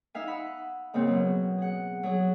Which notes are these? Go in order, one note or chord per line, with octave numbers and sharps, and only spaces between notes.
D#4 E5 F5 G#5
F#5 B5 E6
G#2 C#3 A#3 C4
B2 F#3
G#4 F#5
F#3 G#4